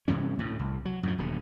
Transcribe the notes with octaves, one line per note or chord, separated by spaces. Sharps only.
G2 C3 E3 C#4
D2 A2
C2
F#3
F#2 A2 F3
D#1 B2 D3